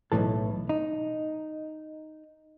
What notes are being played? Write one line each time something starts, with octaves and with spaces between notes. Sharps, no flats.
B1 F#2 A2 E3 A4
D#4